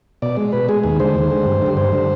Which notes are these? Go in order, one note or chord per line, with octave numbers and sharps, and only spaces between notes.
B2 D5
G#3
B2 B4
G#3 G#4
D#2 G#4
D3 G#3 C5
D#2
D3 G#3
G2
D3 G3
G2 C5
D3 G3